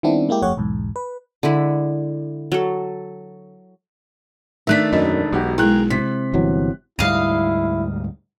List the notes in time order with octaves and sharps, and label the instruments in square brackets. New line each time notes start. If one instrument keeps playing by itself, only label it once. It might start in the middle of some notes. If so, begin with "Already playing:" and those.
[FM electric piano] D#3 G3 B3 C4 D4 E4
G#3 A#3 E4 G4
G1 F2 A3 G4 C#5 F#5
B1 E2 G#2
B4
[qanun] D3 G#3 E4 B5
F#3 A4
[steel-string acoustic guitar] D#3 A3 D4 [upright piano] E5 F#6 B6
[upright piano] E1 [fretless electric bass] F#2 [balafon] D#5
[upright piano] E1 F#4 G4 [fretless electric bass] B1
[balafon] G#3 E4 [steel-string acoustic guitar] G#4 A#4 [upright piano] G5 F#6
[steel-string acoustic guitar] C3 [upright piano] B6
[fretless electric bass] G1 E3 F#3
[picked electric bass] D2 G#2 G3 [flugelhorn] E4 [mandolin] D#5 F5